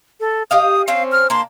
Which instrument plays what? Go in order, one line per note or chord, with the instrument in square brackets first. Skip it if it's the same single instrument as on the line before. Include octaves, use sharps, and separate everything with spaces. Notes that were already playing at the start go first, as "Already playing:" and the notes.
[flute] A4
[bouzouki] G4 D#5 F5 [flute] D#6
[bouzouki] C4 C#4 C5 [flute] F5
[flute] F6
[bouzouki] A#3 D4 [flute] C6